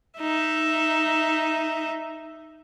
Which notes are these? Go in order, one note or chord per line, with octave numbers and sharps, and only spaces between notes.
D#4 E5